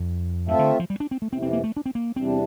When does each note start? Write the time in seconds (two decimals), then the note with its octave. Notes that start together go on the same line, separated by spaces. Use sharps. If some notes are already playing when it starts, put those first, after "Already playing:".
Already playing: F2
0.48 G2 A3 C4 F4 A4 E5
0.59 D3
0.80 F3
0.90 G3
1.00 D4
1.11 C4
1.22 A3
1.32 F2 C3 E3 C4
1.42 C4
1.53 A#3
1.64 A3
1.77 D4
1.86 C4
1.95 A#3
2.16 E2 C3 E3 G3 C4 D4